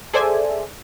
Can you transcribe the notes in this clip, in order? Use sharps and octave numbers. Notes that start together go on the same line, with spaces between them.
G#4 A4 C5 D5 E5 G#5